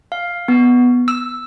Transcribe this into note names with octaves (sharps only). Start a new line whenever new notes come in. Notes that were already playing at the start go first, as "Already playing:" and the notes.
F5
B3
E6